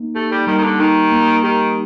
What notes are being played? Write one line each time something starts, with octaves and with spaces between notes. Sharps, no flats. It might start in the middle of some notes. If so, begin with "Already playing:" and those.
Already playing: A#3 D#4
A3 G4
G3
D#3 G3
D#3
D3
D#3 D#4
A#3
D#3 G4